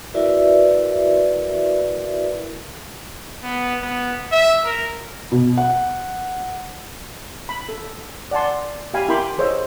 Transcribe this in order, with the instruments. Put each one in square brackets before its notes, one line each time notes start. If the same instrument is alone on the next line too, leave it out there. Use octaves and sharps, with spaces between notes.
[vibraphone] E4 F#4 A#4 B4 D5 E5
[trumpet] B3
B3
E5
A#4
[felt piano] B2
F#5
[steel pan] B5
A4
D5 F#5 G#5 A5 C6
G4 F5 G#5 B5
E4 A#4 G5 B5 C6 D6
G#4 C5 C#5 D#5 F5 E6